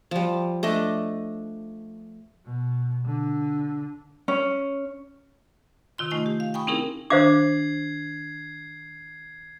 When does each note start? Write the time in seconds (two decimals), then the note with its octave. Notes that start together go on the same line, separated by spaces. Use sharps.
0.11 F3 G3
0.63 A3 D4 D#5
2.45 B2
3.05 D3
4.28 C#4
5.98 C3 D#3 F4 C6
6.11 A3 D#4 D#5 G#5 C#6
6.26 G4
6.40 F5
6.54 G5 G#5 B5 C#6 D#6
6.67 C4 C#4 D#4 E4 G#4 A#4
7.10 D#3 D4 C5 F5 D6 G#6 C7